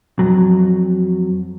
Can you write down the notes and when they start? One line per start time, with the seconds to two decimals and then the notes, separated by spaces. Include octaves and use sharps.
0.19 F2 F#3